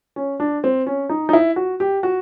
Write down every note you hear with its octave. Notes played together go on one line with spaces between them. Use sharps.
C#4
D4
C4
C#4
D#4
D#4
E4
F#4
G4
F#4